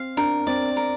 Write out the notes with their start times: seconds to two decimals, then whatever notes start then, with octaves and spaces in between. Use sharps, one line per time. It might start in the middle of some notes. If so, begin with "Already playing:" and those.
Already playing: C4 F5
0.17 D4 A#4
0.47 C4 D5
0.77 A#4